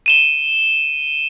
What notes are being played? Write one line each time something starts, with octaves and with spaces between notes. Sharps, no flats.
D#7 E7 G7